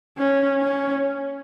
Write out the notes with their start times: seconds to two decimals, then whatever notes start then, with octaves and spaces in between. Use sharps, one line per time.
0.18 C#4
0.61 C#4